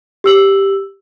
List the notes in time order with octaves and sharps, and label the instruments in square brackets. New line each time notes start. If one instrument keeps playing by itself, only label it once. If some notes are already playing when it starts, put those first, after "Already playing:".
[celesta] G4 E6 F#7